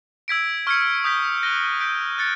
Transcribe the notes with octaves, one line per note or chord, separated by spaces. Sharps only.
E6 G#6 B6 D7
C#6 F6 G#6 C#7
D#6 G6 B6
F#6 A#6 D#7 G7
G6 B6 D7
F#6 A6 C#7